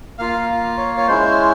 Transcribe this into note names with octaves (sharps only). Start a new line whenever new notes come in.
A#3 F4 F5
C#5
C#5
G#3 C#4 E4 C5